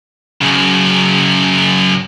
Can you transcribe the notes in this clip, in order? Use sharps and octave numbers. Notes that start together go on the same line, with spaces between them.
F#2 C#3